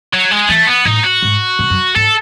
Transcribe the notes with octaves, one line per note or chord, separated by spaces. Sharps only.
F#3
G#3
E3 A3
B3
A2 D#4
F#4
G#2
G#2
F#2
G#2 A4